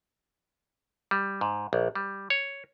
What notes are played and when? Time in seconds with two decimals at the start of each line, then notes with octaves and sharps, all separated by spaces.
1.11 G3
1.41 G#2
1.73 A#1
1.95 G3
2.30 C#5